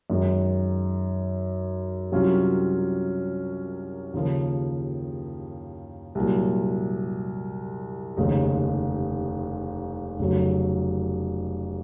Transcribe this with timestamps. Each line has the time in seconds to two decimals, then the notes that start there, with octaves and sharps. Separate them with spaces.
0.10 F#2 D#3 G#3 D#4
2.11 C2 C3 F#3 C#4 F4
4.14 D#2 C#3 F3 A#3
6.15 C2 A#2 F#3
8.17 F1 D#2 C#3 G#3 D#4
10.19 F1 F2 C#3 F#3